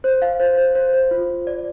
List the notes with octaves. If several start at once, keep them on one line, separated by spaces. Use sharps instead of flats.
C5
F5
C5
C5
C5
C5
F4
F4
D5